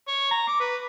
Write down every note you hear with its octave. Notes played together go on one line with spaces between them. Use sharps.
C#5
A#5
D6
B4